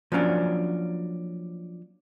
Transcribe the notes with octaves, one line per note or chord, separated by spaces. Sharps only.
F3 F#3 A#3 C#4 D4